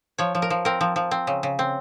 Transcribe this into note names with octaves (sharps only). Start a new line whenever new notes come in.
F3 C#5
F3
A#4
F3
C4 A#4
F3
F3
C4
C#3
C#3
C4